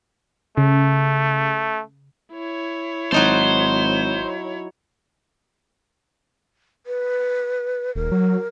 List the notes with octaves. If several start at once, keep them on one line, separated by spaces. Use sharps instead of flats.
C#3 A3
E4 C#5
G#1 F#3 D#4 C5 A5
B4
D#1 A#4
F#3